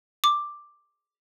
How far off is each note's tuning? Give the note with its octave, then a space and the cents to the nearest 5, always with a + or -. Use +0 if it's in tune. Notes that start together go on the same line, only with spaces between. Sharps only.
D6 +5